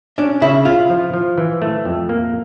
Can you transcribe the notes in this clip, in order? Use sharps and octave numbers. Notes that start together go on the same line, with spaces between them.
C#4 D4 D5
C#3 E4 E5
E4 F4 F5
F3
F3
E3
A3
F2
A#3